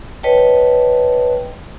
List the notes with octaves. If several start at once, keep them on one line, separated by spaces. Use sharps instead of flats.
B4 C#5 D#5 G5 A5